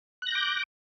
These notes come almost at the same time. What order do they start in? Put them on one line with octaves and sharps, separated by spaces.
F#6 A#6 G6 D6